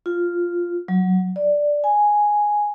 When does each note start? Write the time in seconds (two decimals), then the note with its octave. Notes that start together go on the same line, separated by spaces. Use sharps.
0.06 F4
0.88 F#3
1.36 D5
1.84 G#5